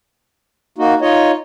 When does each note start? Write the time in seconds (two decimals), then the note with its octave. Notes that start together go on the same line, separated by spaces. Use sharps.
0.78 A#3 D#4 F#4
1.01 D#4 F4 C#5 D#5